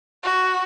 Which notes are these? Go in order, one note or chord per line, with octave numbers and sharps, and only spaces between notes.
F#4